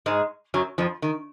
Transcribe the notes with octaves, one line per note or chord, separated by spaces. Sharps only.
G#2 G#3
F#2 F#3
F2 F3
D#3